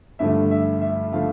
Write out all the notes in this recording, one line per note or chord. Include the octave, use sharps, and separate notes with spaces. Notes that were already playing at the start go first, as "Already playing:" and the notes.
G2 D3 F3 A3 E5
E5
E5
D3 F3 A3 F5